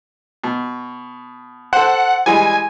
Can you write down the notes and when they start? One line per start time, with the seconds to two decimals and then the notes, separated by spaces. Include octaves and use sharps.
0.44 B2
1.73 A4 C5 F#5
2.26 E3 G3 G#3 G#5